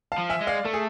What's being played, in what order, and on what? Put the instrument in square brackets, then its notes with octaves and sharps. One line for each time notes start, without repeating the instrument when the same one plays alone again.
[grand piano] F5 A5
[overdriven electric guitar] F3
[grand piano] E5 G#5
[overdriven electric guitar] G#3
[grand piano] D5 F5
[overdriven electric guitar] A3 [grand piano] A4
[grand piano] G#4